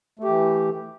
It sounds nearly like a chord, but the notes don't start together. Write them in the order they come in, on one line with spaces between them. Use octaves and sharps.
A3 G4 E3